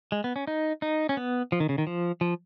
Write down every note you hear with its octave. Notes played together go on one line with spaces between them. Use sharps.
G#3
B3
C#4
D#4
D#4
C#4
B3
F3
D#3
C#3
D#3
F3
F3